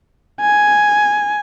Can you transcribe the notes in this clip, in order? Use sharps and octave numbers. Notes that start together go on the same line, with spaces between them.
G#5